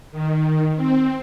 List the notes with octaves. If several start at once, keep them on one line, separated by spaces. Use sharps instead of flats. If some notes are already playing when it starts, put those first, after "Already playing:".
D#3
C4